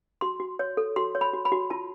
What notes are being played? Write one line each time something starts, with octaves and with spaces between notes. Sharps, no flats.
F#4 C6
F#4
C#5
A4
F#4 C6
C#5
B5
F#4
B5
F#4
F4 A5